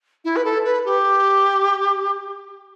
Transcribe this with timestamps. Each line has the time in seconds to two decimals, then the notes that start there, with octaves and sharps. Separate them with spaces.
0.25 E4
0.36 B4
0.45 A4
0.64 B4
0.85 G4